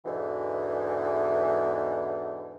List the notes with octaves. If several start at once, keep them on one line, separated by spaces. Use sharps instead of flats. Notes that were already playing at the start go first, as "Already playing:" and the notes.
E2 G#2 B2 D3 E3